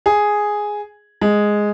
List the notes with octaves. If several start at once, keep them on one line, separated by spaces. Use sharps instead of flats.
G#4
G#3